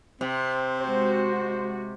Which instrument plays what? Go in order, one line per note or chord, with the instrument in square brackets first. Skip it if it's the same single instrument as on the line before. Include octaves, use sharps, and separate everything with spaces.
[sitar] C3 [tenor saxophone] C4
[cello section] G#3 F#4 [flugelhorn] C5